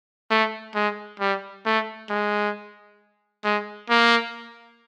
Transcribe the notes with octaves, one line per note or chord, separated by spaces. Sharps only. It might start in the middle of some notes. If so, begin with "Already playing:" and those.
A3
G#3
G3
A3
G#3
G#3
A#3